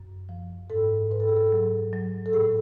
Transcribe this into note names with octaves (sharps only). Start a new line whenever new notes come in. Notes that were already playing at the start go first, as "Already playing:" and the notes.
Already playing: F#2
F3
G#2 A4
G#2 B4
A4
G#4
A4
F#3
F#3
A4
A2 G#4